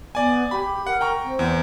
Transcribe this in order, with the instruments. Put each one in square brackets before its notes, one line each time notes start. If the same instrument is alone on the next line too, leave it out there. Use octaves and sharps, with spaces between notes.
[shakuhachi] B3 [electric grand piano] D5 G#5
[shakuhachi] G4 [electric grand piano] B5
[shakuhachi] A#4 [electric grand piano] F#5
[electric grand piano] G5 A#5 C#6
[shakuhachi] C4
[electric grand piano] E2